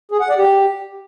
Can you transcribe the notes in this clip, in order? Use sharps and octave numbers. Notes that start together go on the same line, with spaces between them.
G#4
F#5
D5
G4